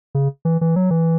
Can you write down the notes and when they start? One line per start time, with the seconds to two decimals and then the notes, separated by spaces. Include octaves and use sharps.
0.15 C#3
0.45 E3
0.61 E3
0.76 F#3
0.90 E3